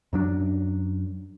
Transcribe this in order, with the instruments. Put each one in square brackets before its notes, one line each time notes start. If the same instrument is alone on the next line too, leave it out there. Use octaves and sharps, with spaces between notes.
[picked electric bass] F#2 F#3 D4